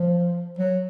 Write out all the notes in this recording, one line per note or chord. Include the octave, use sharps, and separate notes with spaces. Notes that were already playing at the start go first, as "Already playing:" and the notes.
Already playing: F3
F#3